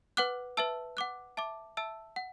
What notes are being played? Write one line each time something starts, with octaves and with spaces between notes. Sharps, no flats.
B4 F#5 D6 F#6
B4 E5 A5 E6
F#5 D6 F#6
E5 A5 D6
E5 A5 E6
F#5